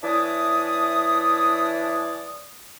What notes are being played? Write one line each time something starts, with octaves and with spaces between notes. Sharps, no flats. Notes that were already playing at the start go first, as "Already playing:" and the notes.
E3 D4 C#5 D5 E5 D#6